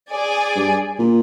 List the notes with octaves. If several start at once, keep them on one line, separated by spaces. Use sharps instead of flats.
G#4 D5 G#5
G2
A#2